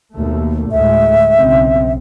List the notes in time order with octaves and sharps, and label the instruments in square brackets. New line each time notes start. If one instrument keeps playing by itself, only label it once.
[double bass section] D#2 B2 A3
[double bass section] D2 A2 G#3 [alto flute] E5
[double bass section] B1 C#3 C4